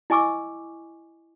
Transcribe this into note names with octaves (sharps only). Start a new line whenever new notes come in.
E4 D#5 G#5 C#6 D6 E6